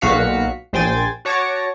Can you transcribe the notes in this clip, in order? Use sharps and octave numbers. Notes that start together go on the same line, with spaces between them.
B1 A#2 F#4 F5 B6 C#7
A#1 C5 G5 G#5 A6
F#4 C#5 A5 D6 A#6 C#7